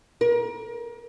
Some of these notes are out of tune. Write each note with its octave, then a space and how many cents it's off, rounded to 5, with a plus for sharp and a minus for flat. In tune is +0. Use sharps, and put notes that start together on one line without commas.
A#4 +30